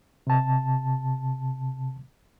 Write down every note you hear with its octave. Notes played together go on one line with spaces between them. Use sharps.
C3 A5